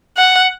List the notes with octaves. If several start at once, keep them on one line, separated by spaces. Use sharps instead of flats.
F#5